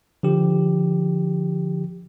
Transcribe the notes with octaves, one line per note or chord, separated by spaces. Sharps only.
D3 F3 G4